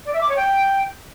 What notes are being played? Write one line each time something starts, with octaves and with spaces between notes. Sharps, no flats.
D5
E5
D6
C#5
G5